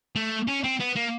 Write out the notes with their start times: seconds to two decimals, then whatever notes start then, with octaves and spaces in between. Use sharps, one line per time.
0.16 A3
0.47 C#4
0.63 C4
0.80 B3
0.96 A#3